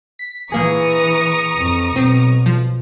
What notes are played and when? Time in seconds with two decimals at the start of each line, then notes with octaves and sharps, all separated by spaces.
0.19 B6
0.52 A#1 E3 A#3 G#4 A#5 C#6 D#6
1.56 F2
1.96 B1 C4
2.46 F3